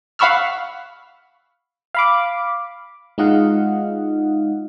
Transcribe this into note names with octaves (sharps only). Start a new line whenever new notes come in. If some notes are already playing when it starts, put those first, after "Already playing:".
F5 F#5 B5 C#6 E6 F6
F5 B5 D6
G#3 D#4 F4 D#5 F5 F#5